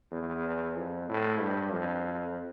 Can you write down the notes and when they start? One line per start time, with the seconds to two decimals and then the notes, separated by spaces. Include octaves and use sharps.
0.12 E2
0.77 F2
1.09 A2
1.41 G2
1.73 F2